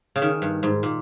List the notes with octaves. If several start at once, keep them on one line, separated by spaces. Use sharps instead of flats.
C#3
D#3
G2
G#2
A#2